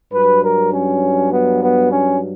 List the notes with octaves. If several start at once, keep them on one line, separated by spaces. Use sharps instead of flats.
G2 F#3 B4
A#4
C#4
B3
B3
C#4